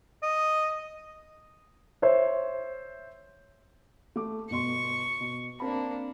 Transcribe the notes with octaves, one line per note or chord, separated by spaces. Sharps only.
D#5
C5 C#5 E5
A3 D6
G1 B2 C6 C#6
B2
A#3 C4 D4 A5 B5